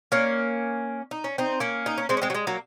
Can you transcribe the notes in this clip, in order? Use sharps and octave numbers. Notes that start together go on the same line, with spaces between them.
A#3 C#4
D#4
C#4
C4 D#4
A#3 C#4
D#4
C#4
G#3 C4
C#4
G#3 C4
F#3
G#3
F#3 A#3